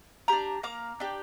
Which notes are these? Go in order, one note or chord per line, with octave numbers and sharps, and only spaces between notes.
D4 G4 A#5 D6
A#3 A#5 D6
D4 G4